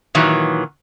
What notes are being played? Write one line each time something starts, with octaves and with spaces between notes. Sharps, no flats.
A#2 D#3 E3 F#3